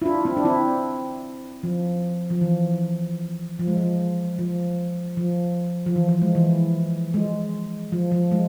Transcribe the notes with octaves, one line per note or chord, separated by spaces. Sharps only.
E4
D4 F4
C4 E4
D4
C4 E4
F3
F3
E3
F3
G#3
F3
F3
F3
F3
E3
F3
G#3
E3
G#3
F3
F3
G#3